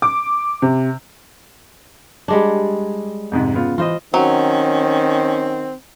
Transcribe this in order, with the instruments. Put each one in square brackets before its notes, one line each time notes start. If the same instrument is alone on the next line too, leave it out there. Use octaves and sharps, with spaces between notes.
[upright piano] D6
C3
[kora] G3 G#3 D4
[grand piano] F2 G#2 C3
C#3 B3 F4
[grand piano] E3 [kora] F4 C5 D#5
[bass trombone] D#3 [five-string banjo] F#3 [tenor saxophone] C4 [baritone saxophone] C#4